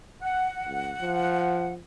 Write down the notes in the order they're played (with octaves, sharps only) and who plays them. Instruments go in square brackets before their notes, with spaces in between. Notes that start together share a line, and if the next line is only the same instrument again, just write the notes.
[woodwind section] F#5
[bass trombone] C#2
F3